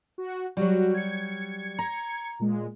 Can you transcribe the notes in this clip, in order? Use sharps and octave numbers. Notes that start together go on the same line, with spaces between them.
F#4
F#3 G3 F#4
G#6 C#7
A#5
A#2 G#3